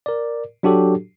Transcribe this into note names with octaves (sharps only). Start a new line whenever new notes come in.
A#4 D5
F#3 D4 F#4 G4 A4